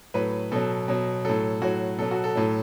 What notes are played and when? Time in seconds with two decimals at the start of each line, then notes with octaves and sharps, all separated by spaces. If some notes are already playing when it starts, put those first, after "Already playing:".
0.14 A2 F#3 B4
0.52 B2 F#3 A4
0.88 B2 F#3
1.25 A2 F#3 A4
1.62 A2 F#3 F#4
1.98 B2 F#3 A4
2.11 F#4
2.24 A4
2.35 A2 F#3